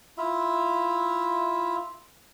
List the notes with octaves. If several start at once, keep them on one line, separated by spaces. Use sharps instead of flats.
E4 F4 E5